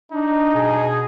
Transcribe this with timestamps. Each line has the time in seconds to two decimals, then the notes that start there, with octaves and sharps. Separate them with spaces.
0.12 D4 D#4
0.55 B2 G#4